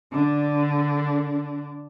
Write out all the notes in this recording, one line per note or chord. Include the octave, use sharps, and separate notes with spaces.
D3 D4